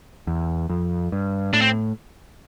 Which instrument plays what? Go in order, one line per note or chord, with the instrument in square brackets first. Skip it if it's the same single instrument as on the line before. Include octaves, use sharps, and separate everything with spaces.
[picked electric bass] E2
F2
G2
[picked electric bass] A2 [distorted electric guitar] D4
[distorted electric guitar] C4